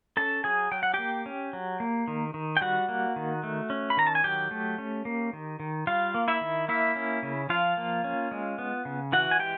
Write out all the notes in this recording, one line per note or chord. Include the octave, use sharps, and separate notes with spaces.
C#4 A4 A5
F#3 G#4 G#5
F#3 G5
F#5
A#3 G4 G5
C#4
F#3
A#3
D#3
D#3
G5
G3 F#4 F#5
A#3
D#3
A3
C#4
B5
D#3 A#5
A5
G#5
F#3 G4 G5
A3
C#4
A#3
D#3
D#3
G3 F4 F5
A#3
E4 E5
D#3
A#3 E4 E5
C#4
C#3
F3 F4 F5
A#3
C#4
G#3
B3
C#3
E3 F#4 F#5
G#5
G#3 G4 G5